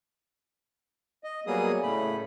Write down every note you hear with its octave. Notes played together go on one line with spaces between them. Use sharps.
D#5
F#3 G3 A#3 B3 G#4 D#6
A2 C#3 A3 B5